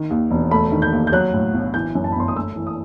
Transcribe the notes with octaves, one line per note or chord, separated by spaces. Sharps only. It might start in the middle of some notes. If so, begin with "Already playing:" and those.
Already playing: D#3
D#2
E1
A3 B5
D#3
G6
D#2
G6
F#3 F#6
A2
B1
E3 G6
F#2
A5
B5
G1 C6
D#6
A3 E6
E3
D#6